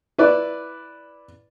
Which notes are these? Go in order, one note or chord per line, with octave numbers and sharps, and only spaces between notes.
E4 B4 D5